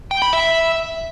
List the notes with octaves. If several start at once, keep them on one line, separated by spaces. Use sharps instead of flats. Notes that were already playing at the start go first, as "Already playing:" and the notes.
G5
B5
E5